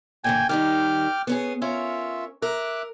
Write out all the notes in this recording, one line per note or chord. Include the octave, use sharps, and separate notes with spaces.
A#2 D3 E3 G5 G#5
D#3 G3 D#4 G5 D6 F6
B3 C#4 G#4
C#4 F4 A#4 C#5 E5
A#4 E5 D6 F#6